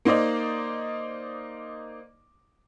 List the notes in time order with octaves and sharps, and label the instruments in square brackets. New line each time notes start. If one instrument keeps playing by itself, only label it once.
[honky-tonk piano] A#3 D#4 C5 D5 D#5